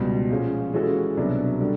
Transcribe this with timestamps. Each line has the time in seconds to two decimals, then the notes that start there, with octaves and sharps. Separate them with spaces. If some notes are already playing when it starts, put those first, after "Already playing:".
Already playing: C#2 B2 G3
0.30 A#2 F3 G#3 C#4
0.73 E3 G#3 C#4 F#4 A4
1.17 C2 B2 F#3 B3 D4
1.60 D3 G3